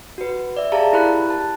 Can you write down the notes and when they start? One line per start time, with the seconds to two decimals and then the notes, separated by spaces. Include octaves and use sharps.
0.18 F#4 B4
0.57 D5 E5
0.72 G4 G#4 D5 F5 A5 A#5
0.93 E4 G4 A#4 B5 F#6
1.30 A5